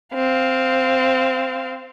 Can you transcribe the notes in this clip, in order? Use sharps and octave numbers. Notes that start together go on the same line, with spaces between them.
C4 F5